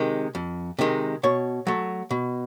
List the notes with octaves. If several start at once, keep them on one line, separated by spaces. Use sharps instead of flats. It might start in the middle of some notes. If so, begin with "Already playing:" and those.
Already playing: C3 D#3 G#3
F2
C3 D#3 G#3
B2 C#5
F#3 A3
B2